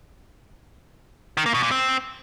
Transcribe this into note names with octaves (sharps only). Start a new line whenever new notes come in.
D#3
A#3
B2
A#2
C4